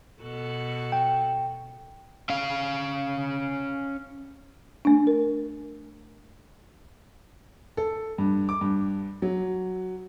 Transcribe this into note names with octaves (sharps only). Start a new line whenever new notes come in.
B2 F#4 A4
G5
C#4 F5
A3 D4
A#4
A4
G2
D6
G2
F#3